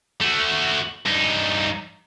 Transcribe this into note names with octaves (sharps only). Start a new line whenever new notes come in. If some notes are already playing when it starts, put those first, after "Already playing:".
A3 F#4
G2 D#4